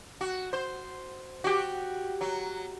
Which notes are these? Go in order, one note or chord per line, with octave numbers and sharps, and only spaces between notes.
F#4
C5
F#4 G4
F#3